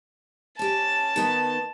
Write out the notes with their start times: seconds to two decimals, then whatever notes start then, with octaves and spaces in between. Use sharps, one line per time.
0.59 C#4 G4 A5
1.16 D#3 B3 D#4